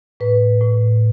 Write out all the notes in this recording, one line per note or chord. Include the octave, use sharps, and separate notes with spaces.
A2 B4
A2